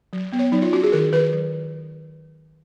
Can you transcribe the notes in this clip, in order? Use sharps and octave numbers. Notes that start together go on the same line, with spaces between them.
F#3
B3
C#5
F#3 D#4
F4
C#4 F#4
G#4
D#3 A#4
D#3 B4
F#3